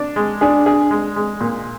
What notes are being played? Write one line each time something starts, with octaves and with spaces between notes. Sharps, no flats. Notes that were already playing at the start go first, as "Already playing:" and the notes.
Already playing: D4
G#3
D4 G#4
G#4
G#3
G#3
A#2